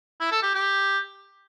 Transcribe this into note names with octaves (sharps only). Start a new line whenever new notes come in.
E4
A4
G4
G4